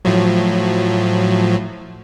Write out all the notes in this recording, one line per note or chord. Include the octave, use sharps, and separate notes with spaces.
A2 F3 F#3